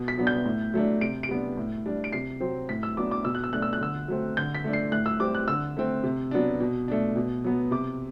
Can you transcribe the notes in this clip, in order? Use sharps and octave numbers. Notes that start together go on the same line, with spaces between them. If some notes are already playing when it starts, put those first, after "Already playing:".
Already playing: B2
B6
F#3 B3 D4
G6
A2
F#3 A3 D4
C3 D7
D7
G3 B3 D4
A2
G3 D4
D7
C3 C7
F#3 C4
A2 B6
E6
F#3 B3 D4 D6
D6
B2 E6
F#6
E6
A3 D4 F#6
E6
F#6
D3 E6
F#3 A3 C4
D3 G6
B6
A3 D4
C7
A2 F#6
E6
G3 C4 D6
F#6
D3 E6
A3 C4
C3
F#3 B3 D4
B2
A3 D4
B2
F#3 B3
C3 D6